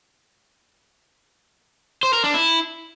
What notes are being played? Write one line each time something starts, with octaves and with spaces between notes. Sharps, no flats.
C5
A#4
D4
E4